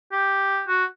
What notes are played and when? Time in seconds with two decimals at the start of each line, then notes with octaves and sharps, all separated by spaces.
0.12 G4
0.68 F#4